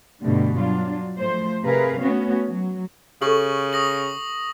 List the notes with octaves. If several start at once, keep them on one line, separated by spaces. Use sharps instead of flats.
G2 B2 D3 G3 A3
F#3 D4 F4
F3 A3 C5
C3 G#4 A#4 B4 F5
A3 B3 C#4 F#4
F#3
C#3 G4 A4 C#6 F#7
D#6 A#6 F#7